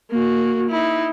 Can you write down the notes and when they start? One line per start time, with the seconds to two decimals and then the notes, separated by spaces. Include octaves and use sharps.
0.11 A#3 F#4
0.69 D#4 E4